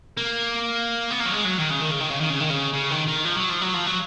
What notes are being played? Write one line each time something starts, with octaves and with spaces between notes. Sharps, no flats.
A#3
B3
A#3
F#3
G#3
F#3
D#3
C#3
D#3
C#3
D#3
C#3
D#3
C#3
D#3
C#3
C#3
D#3
D#3
F3
F#3
F3
F#3
F3
F#3